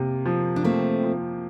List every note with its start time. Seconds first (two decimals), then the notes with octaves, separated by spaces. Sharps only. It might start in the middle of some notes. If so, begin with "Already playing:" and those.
Already playing: C3 A#3
0.26 F3
0.56 D4
0.64 A3 A#3 C4
1.03 F3